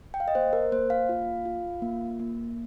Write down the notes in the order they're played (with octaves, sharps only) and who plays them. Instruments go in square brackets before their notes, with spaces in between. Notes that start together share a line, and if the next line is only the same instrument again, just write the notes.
[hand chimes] G5
F5
D#5
A#3 C5
A#4
A#3 C5
F5
F4
F4
A#3
A#3